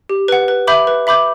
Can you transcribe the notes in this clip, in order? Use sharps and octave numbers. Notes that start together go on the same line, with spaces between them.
G4
B4 F#5
B4
E5 B5 D6 G6
B4
E5 B5 D6 G6